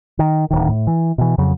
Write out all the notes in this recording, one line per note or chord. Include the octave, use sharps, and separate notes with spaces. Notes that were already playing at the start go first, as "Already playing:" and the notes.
D#3
D1 D#3
A2
E3
B2 E3
F2 C#3 F#3